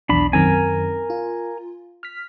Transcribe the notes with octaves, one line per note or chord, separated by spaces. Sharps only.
B1 E2 D4 B5
F#2 D#3 C4 A#4 G#5
F4
F6 B6